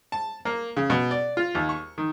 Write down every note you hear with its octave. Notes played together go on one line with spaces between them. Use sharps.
A5
A#3
C#3
B2
D5
F4
D#2
C#6
D#3